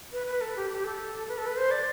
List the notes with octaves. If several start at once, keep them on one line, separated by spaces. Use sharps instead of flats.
B4
B4
A4
G4
G4
A4
B4
A4
B4
C5
D5